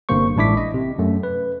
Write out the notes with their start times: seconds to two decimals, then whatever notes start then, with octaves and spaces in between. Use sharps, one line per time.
0.09 G1 G2 C3 A#3 C5 C#6
0.36 A1 G#3 D4 E4 D6 B6
0.57 D#5
0.74 C3
0.99 F#2 A3
1.23 B4